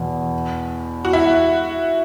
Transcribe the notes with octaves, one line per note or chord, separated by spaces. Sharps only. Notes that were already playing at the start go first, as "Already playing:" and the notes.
Already playing: E2 B2
F#4
E4